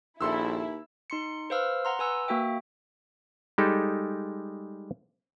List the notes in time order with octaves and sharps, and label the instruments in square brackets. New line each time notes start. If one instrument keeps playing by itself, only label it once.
[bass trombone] A#1 [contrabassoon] D#2 [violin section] E4 [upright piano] A4 C6 E6
[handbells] D#4 C6 C#7
B4 C5 F5 E6 F6
F#5 A#5 C6
B4 G#5 E6
A#3 F#4 E5 G5
[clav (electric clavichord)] G3 G#3 D#4 G4 A4